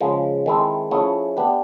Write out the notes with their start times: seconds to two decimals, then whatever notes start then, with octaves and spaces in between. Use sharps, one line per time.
0.01 C#3 F3 G#3
0.46 D#3 G#3 C4 E4 A4
0.91 F3 A3 C#4 E4 G#4
1.37 B3 D4 G4 B4